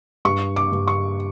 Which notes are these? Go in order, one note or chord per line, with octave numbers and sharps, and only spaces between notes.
G2 C#6
D6
G2
C#6